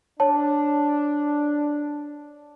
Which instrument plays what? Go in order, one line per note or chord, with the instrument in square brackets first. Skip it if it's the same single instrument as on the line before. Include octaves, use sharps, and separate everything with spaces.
[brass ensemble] D4 [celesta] C#5 A5